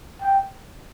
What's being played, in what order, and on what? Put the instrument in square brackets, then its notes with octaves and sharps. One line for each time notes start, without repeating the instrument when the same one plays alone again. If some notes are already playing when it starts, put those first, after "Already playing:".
[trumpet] G5